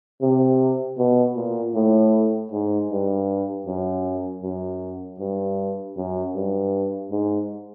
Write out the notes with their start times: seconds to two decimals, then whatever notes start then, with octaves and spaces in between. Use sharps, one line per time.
0.22 C3
0.98 B2
1.36 A#2
1.75 A2
2.52 G#2
2.90 G2
3.66 F#2
4.43 F#2
5.19 G2
5.96 F#2
6.35 G2
7.11 G#2